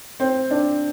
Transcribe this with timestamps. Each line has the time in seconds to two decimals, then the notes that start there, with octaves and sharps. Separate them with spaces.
0.20 C4
0.51 D4